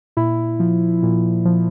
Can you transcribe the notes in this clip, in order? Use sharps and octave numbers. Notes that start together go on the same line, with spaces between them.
A#2 E4
F3
A#2
F3